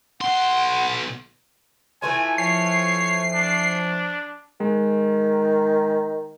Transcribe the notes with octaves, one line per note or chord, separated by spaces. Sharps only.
B1 F#5 C6
E3 A3 F4 G#5
F3 C#5 C7
D4
D#3 G#3